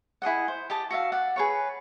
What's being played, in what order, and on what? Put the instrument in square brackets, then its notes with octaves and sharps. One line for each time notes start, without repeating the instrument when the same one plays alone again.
[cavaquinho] E4 G#4 D#5 F#5
C5
G4 D#5 A5
F#4 E5 F5
D5 F#5
G#4 B4 C#5